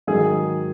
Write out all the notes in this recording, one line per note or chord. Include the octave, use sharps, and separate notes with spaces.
G#2 D#3 F#3 G#4